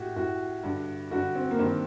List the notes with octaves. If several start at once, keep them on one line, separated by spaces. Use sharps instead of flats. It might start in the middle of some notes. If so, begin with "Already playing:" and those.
Already playing: A2 F#4 G4
A2 F#4
G2 D3
G2 D3 F#4
C4
A#3
G2 D#3 C4